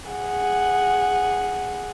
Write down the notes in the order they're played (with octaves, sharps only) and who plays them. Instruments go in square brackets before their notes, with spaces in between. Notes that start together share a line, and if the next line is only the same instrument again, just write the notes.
[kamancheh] G#4 F#5